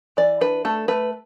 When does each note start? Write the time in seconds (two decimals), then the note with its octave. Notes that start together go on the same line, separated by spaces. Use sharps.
0.17 E3 D5
0.41 D4 B4
0.65 A3 A4
0.88 A3 B4